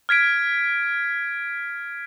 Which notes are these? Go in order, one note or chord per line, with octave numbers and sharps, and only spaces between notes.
F6 G#6 B6 D7